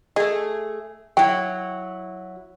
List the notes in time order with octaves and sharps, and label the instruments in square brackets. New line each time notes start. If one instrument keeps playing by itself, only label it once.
[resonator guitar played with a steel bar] A3 G#4 [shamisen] D#5
[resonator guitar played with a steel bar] F#3 E4 [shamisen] G5